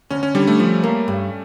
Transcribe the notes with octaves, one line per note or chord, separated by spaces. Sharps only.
D2 C#4
C#4
D3 G3
A3
F3
A#3
G2